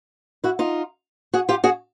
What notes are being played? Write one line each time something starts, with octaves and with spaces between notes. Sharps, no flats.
E4 F#4
D#4 F4
F#4 G#4
F4 G4
F#4 G#4